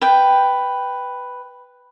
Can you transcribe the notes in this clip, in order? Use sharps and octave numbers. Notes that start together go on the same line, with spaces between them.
B4 G5